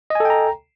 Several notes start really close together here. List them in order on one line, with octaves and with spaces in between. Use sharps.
D#5 G#5 A4 G5 A#5